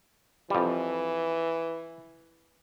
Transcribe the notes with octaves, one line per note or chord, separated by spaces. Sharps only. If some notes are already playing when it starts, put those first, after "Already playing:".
F2 E3 G3